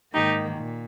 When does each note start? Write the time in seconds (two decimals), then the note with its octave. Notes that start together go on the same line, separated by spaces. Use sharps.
0.13 G#2 D#3 A#3 D#4 G4
0.57 A#2